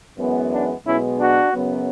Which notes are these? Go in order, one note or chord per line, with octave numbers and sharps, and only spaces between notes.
F#2 E3 G#3 B3
D4
B1 B2 G#3 B3 C#4 E4
D4 F#4
F#2 C#3 F#3 B3